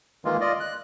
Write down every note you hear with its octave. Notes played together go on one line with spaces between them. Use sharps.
D#3 E3 G#3 A#3 F4
F4 D5 D#5
F#6